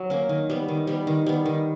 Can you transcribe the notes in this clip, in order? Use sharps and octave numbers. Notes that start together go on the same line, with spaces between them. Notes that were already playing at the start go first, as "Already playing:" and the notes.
Already playing: F#3
A#3 C#4
D#3
G3 B3
D#3
G3 B3
D#3
G3 B3
D#3